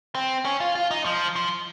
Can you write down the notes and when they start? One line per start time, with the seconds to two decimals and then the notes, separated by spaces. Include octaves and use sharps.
0.15 C4
0.45 C#4
0.60 F4
0.75 F4
0.91 D#4
1.06 F3
1.36 F3